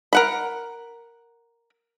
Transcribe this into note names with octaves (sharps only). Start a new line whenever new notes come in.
A#4 F#5 B5